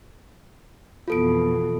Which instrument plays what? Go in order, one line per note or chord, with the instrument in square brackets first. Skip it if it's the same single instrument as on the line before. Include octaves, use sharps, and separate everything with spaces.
[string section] F2 B2 E3 [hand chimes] F4 A4 D7